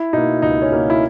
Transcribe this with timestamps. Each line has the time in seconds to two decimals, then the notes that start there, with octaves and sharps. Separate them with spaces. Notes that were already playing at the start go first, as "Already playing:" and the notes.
Already playing: E4
0.13 B2 A#3 D#4
0.42 C#2 D#4
0.62 C#4
0.72 B2 A#3
0.90 E4